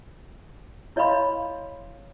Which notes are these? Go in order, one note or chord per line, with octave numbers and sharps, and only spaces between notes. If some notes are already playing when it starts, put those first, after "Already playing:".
E4 C#5 D#5 F5 B5 C6